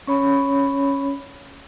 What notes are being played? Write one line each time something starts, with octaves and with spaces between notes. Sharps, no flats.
C#4 C#5 B5